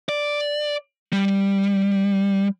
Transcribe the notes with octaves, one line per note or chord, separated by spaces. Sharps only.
D5
G3